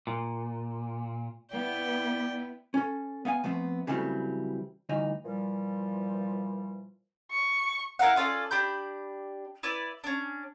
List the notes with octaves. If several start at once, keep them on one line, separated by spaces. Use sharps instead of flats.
A#2
B3 E4 B4 D5 G5
C#4 A4
B3 F5 F#5 G#5
F3 A3 B3 C4
C#3 E3 F#3 G3 A3 C4
D2 G2 E3 D#4
A#2 E3 F3 G3
C#6
E4 A#4 F5 F#5
C#4 F4 A4 D5
D4 G4 B5 G6
E4 B4 D5
C#4 D4